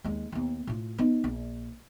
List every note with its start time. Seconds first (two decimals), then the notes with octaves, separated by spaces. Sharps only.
0.04 D#2 G#3
0.32 D#2 B3
0.67 A2 F4
0.98 B3 D#4
1.24 A#1